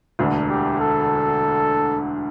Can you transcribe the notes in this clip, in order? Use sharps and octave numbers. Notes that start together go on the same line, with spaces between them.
E1 D2 D3
G4
A4